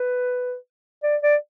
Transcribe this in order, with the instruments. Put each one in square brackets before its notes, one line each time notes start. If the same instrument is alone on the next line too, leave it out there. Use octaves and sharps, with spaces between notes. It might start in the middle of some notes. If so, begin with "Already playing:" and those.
Already playing: [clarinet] B4
D5
D5